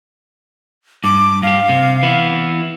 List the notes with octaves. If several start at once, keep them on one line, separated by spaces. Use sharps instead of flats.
G2 D6
G2 G4 F5
C3
E3 B3 E4